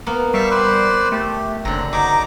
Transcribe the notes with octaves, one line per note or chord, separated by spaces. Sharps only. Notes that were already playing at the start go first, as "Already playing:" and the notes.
A#3 B3
G3 E5 F5 C#6
B4 C5 D5
A3 G4
F#1 D3 C4 A#5
F#3 D#4 A#5 D6